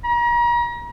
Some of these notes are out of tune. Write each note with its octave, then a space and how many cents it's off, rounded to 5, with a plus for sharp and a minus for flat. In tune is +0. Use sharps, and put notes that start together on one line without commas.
A#5 +40